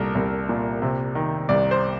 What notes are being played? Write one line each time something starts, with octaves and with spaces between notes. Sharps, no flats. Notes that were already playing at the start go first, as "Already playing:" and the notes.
Already playing: C2 A#2 A4 A#4
C2
A#2
C3
D#3
C2 D5
C5